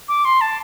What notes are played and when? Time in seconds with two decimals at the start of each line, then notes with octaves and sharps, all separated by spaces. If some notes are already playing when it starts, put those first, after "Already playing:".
0.08 D6
0.25 C6
0.41 A5